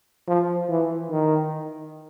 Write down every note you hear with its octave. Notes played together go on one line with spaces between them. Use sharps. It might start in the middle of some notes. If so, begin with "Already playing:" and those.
F3
E3
D#3